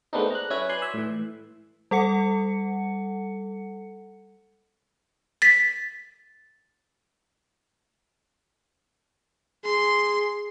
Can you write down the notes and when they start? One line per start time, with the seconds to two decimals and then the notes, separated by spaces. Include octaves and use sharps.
0.13 G#3 A3 B3 C4 D4 D#4
0.31 A#5 F#6
0.50 F#3 C#4 E4 B4 G#6
0.69 B4 D5 G#5 C6 F#6 G#6
0.82 E5
0.94 A2 E3
1.91 G3 A4 F#5 C#7
5.42 A6 B6
9.65 G#4 C6